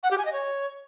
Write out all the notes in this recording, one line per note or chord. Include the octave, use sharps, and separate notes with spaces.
F#5
G4
G#5
D#5
C#5